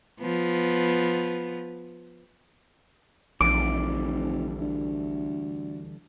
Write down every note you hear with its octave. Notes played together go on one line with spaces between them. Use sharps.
F3 B3
F1 A#1 D3 E3 G3 D6
D2